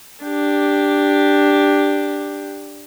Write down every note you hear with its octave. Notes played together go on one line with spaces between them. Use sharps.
D4 G4